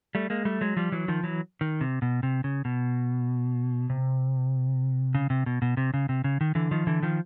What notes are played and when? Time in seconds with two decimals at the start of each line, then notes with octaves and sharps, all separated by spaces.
0.15 G3 A3
0.30 G#3 A#3
0.45 G3 A3
0.61 F#3 G#3
0.77 F3 G3
0.92 E3 F#3
1.08 D#3 F3
1.23 E3 F#3
1.61 D#3
1.81 C3
2.02 B2
2.23 C3
2.44 C#3
2.65 B2
3.90 C3
5.15 C#3
5.30 C3
5.46 B2
5.62 B2
5.77 C3
5.94 C#3
6.09 C3
6.24 C#3
6.41 D#3
6.55 D3 E3
6.71 D#3 F3
6.87 D3 E3
7.03 D#3 F3